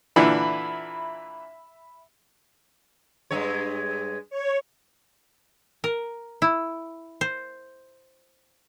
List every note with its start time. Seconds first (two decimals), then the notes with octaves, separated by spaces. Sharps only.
0.16 A#2 D3 E3 E5 B5
3.31 G2 G#3 C#5
4.30 C#5
5.84 A#4
6.42 E4
7.21 C5